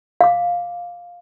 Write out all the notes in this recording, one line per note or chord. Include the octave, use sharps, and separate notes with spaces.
F5 D6